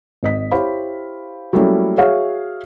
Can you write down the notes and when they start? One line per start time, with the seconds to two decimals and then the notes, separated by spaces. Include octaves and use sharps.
0.23 G#1 D#5 B6
0.52 E4 G4 C5 C#5 F5 B5
1.53 F#3 G3 A3 A#3 C#4 E4
1.98 F#4 G#4 C#5 E5 F5